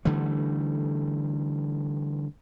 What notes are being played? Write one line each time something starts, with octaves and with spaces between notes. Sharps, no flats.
D3 E3 G3 A3